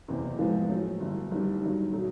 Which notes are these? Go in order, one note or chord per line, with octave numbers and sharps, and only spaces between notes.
F#1 E2 C3 E3
A2 F3 G#3 B3
A2 F#3 A3 C#4
G1 G2 E3
G1 G2 D#3 G3
G2 D#3 F#3
B2 F#3 A3